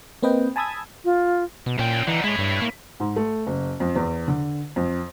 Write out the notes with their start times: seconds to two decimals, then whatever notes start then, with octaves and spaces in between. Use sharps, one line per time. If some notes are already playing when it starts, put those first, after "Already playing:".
0.23 A#3 C4 B4 D#5 G5
0.56 G#5 A5 B5 D#6 E6 G#6
1.05 F4
1.66 B2
1.79 A#2 C#4 G5
2.07 D3 E3 D#4
2.24 G#3 E4 C#5
2.38 G2
2.62 A#3
3.00 G#2
3.16 A3
3.47 F#1
3.80 F2
3.95 E2
4.28 D3
4.76 F2